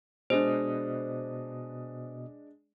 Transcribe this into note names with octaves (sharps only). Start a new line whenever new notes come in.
B2 G#3 D4 C5 D#5 D#6